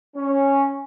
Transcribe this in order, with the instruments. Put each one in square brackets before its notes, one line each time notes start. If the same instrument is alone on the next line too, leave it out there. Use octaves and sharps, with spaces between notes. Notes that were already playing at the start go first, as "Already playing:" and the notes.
[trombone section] C#4